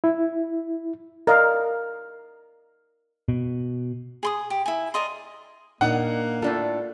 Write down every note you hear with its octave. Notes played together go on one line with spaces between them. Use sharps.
E4
A#4 D5 D#5 F5
B2
G#4 C6 D#6
G4
E4 G#5
A#4 D5 D#5 C6
A#2 A#3 D4 D#4 F#5
A2 D4 F4 A4